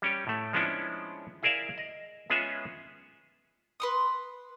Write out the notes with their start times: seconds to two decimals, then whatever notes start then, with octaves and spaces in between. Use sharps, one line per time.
0.02 G3 C#4 G4
0.27 A2 A3
0.53 F3 G#3 B3 C#4 D4 E4
1.43 E4 G#4 A#4 D5 E5 F5
1.78 D#5
2.30 G#3 B3 C#4 F4 G#4 E5
3.80 B4 C6 D#6